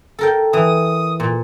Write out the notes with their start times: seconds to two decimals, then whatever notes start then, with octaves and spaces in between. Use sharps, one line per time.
0.19 A4 A#4 G5
0.53 E3 D#6
1.20 A#2